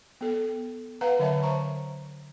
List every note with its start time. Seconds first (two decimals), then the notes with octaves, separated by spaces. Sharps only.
0.21 B3 A4
1.01 B4 F5 F#5 A#5
1.19 D3 F#3 C#5 E5 A5
1.43 C5 A#5 C#6